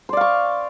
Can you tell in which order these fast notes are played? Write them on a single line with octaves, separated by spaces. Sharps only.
C5 D5 F5 C#6